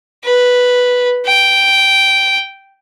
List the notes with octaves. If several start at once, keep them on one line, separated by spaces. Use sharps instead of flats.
B4
G5